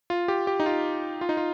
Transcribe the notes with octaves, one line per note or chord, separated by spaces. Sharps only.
F4
G4
G4
D#4
F4
F4
D#4
F4